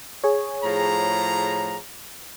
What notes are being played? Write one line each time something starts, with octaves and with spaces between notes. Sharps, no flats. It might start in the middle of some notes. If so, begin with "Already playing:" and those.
G#4 C#5
A2 F3 A#5